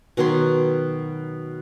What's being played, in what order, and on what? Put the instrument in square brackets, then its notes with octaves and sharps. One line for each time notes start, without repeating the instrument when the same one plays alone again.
[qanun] B2 D#3 F#3 C6